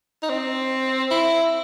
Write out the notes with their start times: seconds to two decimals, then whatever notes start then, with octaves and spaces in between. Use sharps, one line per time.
0.23 D#4
0.30 C4
1.11 E4